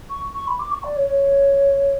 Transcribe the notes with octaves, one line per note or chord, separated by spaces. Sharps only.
C#6
C#6
B5
D6
C#6
D5
C#5
C#5